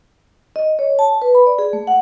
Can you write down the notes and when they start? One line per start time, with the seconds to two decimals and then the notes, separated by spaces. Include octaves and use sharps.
0.56 D#5
0.79 C#5
0.99 A5
1.22 B4
1.35 B5
1.46 D5
1.59 G#4
1.73 A3
1.87 F#5